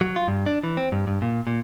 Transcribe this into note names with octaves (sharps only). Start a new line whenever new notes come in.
F#3
F4
G2
D4
E3
C4
G2
G2
A#2
A#2